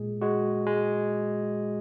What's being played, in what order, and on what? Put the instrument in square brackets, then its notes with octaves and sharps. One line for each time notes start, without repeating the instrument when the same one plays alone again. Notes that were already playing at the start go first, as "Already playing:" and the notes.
Already playing: [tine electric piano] A#2 G#3 G#4
G#3 F#4
G#3